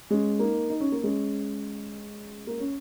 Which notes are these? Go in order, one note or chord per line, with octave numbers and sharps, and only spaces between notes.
G#3 C#4
A#3 D#4
D#4
C#4
A#3
G#3 C#4
A#3
C#4